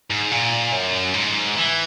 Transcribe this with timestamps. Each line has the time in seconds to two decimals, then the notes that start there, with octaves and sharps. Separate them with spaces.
0.10 G#2
0.31 A#2
0.72 F#2
1.14 G#2
1.56 E3